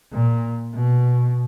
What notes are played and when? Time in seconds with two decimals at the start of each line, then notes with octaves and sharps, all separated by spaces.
0.12 A#2
0.73 B2